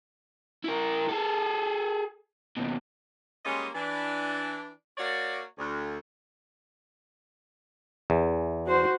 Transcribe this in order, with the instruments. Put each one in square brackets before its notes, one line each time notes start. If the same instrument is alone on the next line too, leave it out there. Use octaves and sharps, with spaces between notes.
[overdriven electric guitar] E4 A#4
G#4 A4
D#2 B2
[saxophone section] G3 G#3 A#3 C#4 F4 D#5
E3 D4
A#3 F#4 C#5 D5
D2
[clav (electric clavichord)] E2
[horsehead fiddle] F#4 C5